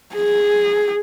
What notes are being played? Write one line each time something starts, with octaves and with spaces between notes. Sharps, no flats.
G#4